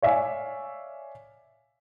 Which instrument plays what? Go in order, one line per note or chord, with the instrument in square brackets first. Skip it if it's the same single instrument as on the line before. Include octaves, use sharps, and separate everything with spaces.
[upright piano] C#5 D5 E5 F5 G#5